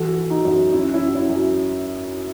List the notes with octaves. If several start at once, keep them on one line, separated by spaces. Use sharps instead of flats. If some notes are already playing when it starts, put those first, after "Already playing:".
Already playing: E3 F#4 A4
E3
D#4 F#4
F#2
F#2 C#4 E4
C#4 E4
F#2
F#4
C#4 E4
F#2